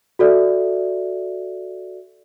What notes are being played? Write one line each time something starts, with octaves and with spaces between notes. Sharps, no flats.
F#4 A4 D5 E5